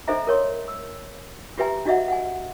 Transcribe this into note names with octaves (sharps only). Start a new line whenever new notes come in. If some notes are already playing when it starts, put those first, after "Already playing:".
D4 A4 C5 D#5 E5 A#5
A#4 C#5 C6
E6
F4 G4 B4 E5 G#5 A#5
D4 F#4 D#5 E5 F#5
F#5 G#5